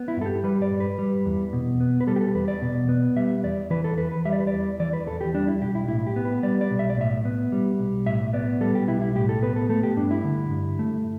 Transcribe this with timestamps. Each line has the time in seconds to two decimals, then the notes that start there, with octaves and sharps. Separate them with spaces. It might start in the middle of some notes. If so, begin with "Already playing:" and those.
Already playing: B3
0.08 E4
0.17 G2 A4
0.26 G4
0.44 G3 B4
0.62 D5
0.71 G2
0.80 B4
0.98 G3
1.26 E2
1.53 B2
1.80 B3
2.01 B4
2.07 G3 A4
2.16 G4
2.21 A4
2.34 E2 B4
2.48 D5
2.62 B2
2.89 B3
3.16 G3 E5
3.43 E2 D5
3.70 E3 B4
3.84 A4
3.98 E2 B4
4.12 B4
4.25 G3 E5
4.33 D5
4.40 B4
4.47 D5
4.53 E2
4.80 E3 D5
4.93 B4
5.07 E2 A4
5.21 G4
5.34 G3 D4
5.48 E4
5.61 B1 G4
5.75 E4
5.88 A2 E4
6.07 G4
6.16 B3
6.25 B4
6.43 G3 D5
6.61 D5
6.71 B1
6.79 E5
6.90 D5
6.97 A2 E5
7.25 B3
7.52 G3
7.79 B1
8.06 A2 E5
8.33 B3 D5
8.61 G3 A4
8.75 G4
8.88 B1 E4
9.01 E4
9.16 A2 G4
9.29 A4
9.43 B3 B4
9.56 A4
9.69 A3 A4
9.83 G4
9.97 G2 D4
10.11 E4
10.24 D3
10.51 G2
10.79 A3